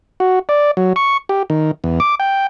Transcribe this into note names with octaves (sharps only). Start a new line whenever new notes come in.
F#4
D5
F#3
C#6
G4
D#3
E2
D6
G5